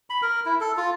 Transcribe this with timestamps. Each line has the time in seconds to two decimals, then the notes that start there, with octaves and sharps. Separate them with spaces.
0.10 B5
0.22 A#4
0.46 E4
0.61 A4
0.77 F4